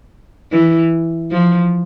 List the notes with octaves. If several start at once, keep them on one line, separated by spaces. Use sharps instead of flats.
E3
F3